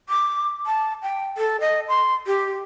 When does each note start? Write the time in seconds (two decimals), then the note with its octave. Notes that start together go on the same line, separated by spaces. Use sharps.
0.09 D6
0.66 A5
1.03 G5
1.37 A4
1.60 D#5
1.89 C6
2.27 G4